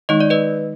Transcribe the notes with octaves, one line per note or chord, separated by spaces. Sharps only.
D#3 G#3 D#4 D#5
D5
B4 D#5